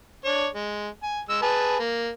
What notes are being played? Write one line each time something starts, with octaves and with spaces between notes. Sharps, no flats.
D4 C#5
G#3
G#5
G#3 E6
G#4 B4 A5
A#3